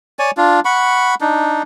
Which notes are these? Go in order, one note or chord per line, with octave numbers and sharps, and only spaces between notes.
C#5 D5 G#5
D4 F4
F#5 B5 C#6
D4 D#4